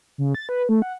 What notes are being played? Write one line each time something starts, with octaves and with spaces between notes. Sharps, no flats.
C#3
A6
B4
A3
F#5